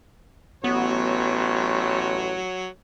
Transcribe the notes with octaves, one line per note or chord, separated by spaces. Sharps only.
A1 F#3 B3 C#5